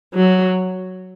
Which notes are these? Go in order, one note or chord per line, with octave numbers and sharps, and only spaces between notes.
F#3